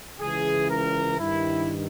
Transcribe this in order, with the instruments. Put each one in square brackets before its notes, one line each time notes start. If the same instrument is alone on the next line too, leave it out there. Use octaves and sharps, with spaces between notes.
[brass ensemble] C#2 C#3 E3 G#4
A#4
G2 D#3 E4